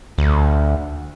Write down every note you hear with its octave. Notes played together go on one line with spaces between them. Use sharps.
D2